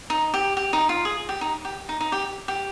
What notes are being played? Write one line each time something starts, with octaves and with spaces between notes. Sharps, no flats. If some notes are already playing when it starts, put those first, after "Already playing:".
D#4
G4
G4
D#4
F4
G#4
G4
D#4
G4
D#4
D#4
G4
G4